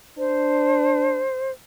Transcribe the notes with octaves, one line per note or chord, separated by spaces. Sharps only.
D4 C5